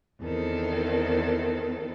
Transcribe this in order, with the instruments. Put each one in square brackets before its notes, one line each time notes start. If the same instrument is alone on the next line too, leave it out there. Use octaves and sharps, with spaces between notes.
[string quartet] E2 D#3 C4 A4